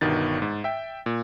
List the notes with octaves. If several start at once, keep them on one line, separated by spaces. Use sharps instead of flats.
G1 G2 B2 D#3 A6
G#2
E5 G5
A#2